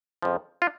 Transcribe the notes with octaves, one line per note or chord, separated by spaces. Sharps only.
F2 C#3 F3
F4